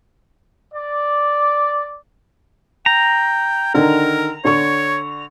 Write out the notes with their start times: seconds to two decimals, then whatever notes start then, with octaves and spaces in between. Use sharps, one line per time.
0.74 D5
2.86 G5 A#5
3.74 D3 D#3 A#4
4.45 D3 C#5 C#6